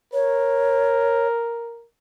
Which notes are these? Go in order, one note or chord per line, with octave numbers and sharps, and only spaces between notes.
A#4 C#5